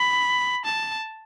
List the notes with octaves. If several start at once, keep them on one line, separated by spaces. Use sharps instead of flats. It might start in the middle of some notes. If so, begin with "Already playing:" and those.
Already playing: B5
A5